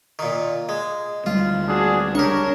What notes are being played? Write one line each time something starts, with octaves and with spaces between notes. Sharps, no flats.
A#2 D#3
G#3
D2 G3 G#3 F4
D4 F#4 G#4
C#2 D4 G4 A#4 C#5 C#6